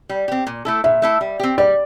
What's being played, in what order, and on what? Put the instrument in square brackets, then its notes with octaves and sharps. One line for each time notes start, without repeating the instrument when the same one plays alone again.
[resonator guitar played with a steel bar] G3
C4 G4
A#2
A3 E4 A4
[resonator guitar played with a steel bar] A#2 [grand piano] E5
[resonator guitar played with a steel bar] A3 E4 A4
G3
C4 G4
[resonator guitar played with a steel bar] G3 [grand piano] D5